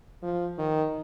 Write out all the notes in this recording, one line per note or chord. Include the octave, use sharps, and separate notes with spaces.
F3
D#3